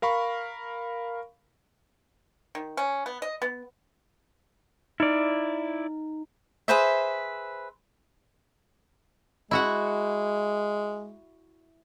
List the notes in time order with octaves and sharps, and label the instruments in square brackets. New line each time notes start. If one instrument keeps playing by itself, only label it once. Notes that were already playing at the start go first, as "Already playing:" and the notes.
[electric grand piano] A#4 F5 B5 C#6
[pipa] D#3
C#4
B3
D#5
B3
[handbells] D#4 [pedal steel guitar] E4 D5
[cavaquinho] G#4 B4 C5 E5
[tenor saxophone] G#3 [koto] E4 F#4 F#5